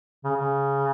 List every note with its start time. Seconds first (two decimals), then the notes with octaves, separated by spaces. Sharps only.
0.24 C#3
0.37 C#3